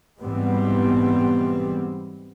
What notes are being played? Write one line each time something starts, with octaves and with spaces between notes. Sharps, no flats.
G#2 B2 E3 G3 B3 C4